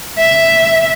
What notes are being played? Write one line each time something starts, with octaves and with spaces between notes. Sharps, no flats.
E5